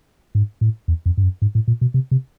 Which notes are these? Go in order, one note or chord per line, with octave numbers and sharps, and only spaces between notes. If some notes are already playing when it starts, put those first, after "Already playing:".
G#2
A2
E2
F2
G2
F#2
G#2
A2
A#2
B2
C3
C3